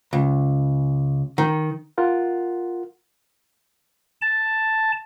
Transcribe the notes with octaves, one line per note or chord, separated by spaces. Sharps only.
C#2
D#3
F4 A#4 F#5
A5